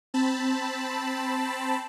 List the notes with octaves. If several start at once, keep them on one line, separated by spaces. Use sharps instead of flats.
C4 A5 B5